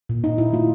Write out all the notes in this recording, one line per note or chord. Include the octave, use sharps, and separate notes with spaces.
A#2
A#2 D#4
A#2 E4
A3 F4